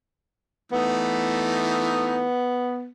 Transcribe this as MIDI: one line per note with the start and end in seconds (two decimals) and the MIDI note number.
0.72 2.27 52
0.72 2.27 57
0.72 2.88 59
0.72 2.27 63